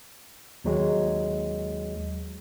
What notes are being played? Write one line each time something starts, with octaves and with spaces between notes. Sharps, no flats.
D#2 F#3 G#3